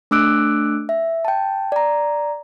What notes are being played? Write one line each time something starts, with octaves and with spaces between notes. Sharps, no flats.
A3 D4 D6 E6 F#6 D7
E5
G5 A5
D5 A#5